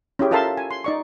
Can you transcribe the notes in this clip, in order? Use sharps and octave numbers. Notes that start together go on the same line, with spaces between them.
C#4 E4 G4 G#4
F4 A4 A#4 E5 A5 C6
G#5
C6
D#4 D5 C#6